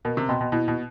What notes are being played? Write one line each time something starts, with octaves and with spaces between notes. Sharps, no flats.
B2 A#4
C3
B2 D#5 G5 C6
B2
B2 E4
B2